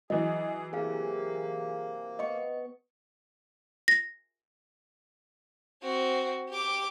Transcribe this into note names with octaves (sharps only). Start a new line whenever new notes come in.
E3 F#3 G#4 D#5
C3 A#3 G#4 F5
B3 D#5 C#6
A#6
C4 F#4
G4 D6